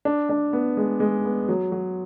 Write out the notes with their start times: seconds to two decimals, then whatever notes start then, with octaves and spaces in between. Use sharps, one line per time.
0.05 D4
0.29 D4
0.53 B3
0.77 G#3
1.00 G#3
1.25 B3
1.49 F#3
1.72 F#3